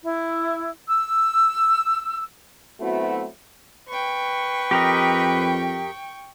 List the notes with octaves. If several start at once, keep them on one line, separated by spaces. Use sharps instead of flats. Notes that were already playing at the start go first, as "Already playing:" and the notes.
E4
E6
F#3 A3 B3 C4 E4 F#4
B4 G5 C#6
F2 G4 A#4 D#5